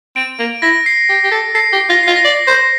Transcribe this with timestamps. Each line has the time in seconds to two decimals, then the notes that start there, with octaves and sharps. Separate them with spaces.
0.16 C4 D7
0.39 A#3
0.62 E4 A#6
0.86 C7
1.09 G4
1.24 G4
1.32 A4
1.55 A4 C7
1.72 G4
1.89 F4 A#6
2.03 F4 C7
2.16 A#6
2.25 D5
2.47 C5